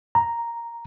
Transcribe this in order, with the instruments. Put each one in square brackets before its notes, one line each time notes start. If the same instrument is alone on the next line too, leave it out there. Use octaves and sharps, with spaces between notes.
[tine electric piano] A#5